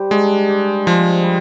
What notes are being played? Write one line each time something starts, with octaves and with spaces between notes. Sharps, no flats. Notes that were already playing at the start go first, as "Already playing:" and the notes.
Already playing: G3 G4 C5
G#3 D4
G4
F3 C5
G3